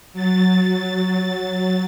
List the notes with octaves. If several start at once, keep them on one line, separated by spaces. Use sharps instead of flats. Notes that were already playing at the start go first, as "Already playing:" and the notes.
F#3 A6